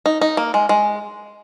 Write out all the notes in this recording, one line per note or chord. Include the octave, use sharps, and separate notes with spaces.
D#4
D#4
A#3
G#3
G#3